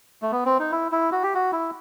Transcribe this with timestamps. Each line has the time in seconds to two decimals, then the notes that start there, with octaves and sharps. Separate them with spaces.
0.22 A3
0.32 B3
0.45 C4
0.59 D#4
0.72 E4
0.92 E4
1.12 F#4
1.23 G4
1.35 F#4
1.52 E4